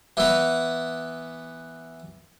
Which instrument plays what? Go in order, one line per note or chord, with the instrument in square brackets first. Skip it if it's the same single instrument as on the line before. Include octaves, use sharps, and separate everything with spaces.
[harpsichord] E3 B3